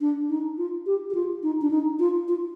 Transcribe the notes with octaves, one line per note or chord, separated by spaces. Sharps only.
D4
D#4
F4
G4
G4
F4
D#4
D4
D#4
F4
F4